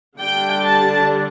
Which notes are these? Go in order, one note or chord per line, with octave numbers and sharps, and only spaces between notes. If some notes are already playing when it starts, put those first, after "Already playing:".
D3 G3 D4 G5
A5